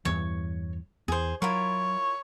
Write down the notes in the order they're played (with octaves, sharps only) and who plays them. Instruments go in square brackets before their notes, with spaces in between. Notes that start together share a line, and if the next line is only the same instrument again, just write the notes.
[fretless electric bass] E2 G2 E3 [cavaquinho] C#5 C#6
[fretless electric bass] E2 [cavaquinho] G#4 C5
[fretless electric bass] F#3 [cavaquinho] E4 F4 A#4 [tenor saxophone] C#5